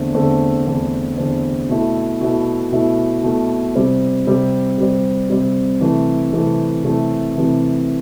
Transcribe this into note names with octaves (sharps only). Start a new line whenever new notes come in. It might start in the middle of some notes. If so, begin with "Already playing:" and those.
Already playing: E2 D3 A3 C4
E2 D3 A3 C4
E2 D3 A3 C4
E2 D3 A3 C4
B2 A3 E4
B2 A3 E4
B2 A3 E4
B2 A3 E4
C3 G3 C4
C3 G3 C4
C3 G3 C4
C3 G3 C4
C3 E3 A3
C3 E3 A3
C3 E3 A3
C3 E3 A3